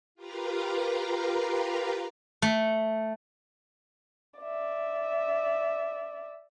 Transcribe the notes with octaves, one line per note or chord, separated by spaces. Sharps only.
F4 G4 A#4 B4 F5 A#5
A3
D5 E5